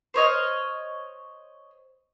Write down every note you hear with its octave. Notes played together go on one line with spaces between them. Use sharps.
C5 C#5 D#5 F6